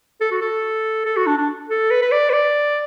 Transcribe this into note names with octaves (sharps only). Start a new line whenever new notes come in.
A4
F#4
A4
A4
F#4
D4
D4
A4
B4
B4
D5
B4
D5